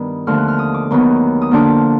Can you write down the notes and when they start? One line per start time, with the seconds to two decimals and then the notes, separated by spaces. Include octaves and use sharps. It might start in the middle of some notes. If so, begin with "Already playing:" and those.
Already playing: G2 D#3 G3 B3 D#6
0.27 D#2 D3 F3 A3 F6
0.38 F#6
0.48 F6
0.59 D#6
0.74 D6
0.90 D#2 D#3 F#3 B3 D#4
1.42 D#6
1.51 D3 F3 A#3 D4 D6